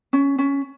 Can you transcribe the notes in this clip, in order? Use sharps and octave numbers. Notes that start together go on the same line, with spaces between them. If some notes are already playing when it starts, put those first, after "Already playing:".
C#4
C#4